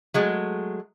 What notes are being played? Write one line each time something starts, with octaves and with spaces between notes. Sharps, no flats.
F#3 G#3 A3